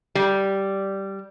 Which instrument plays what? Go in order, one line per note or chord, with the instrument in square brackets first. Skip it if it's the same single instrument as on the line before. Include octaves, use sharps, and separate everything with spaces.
[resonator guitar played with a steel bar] G3